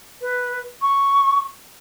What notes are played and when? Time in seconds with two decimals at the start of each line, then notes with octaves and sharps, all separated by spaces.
0.21 B4
0.82 C#6